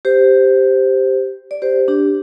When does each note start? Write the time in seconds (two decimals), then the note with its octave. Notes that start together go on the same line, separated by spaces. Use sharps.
0.05 G4 C5
1.51 D5
1.62 G4 C5
1.88 D4 G4